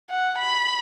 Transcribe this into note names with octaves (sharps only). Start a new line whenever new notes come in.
F#5
B5